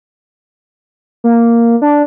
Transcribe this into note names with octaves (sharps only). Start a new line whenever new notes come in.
A#3
D4